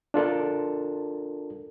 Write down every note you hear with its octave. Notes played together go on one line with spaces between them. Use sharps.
D4 F4 A4 A#4